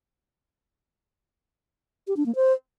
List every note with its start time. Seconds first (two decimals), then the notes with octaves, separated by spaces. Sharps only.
2.07 G4
2.17 D4
2.26 A#3
2.35 C5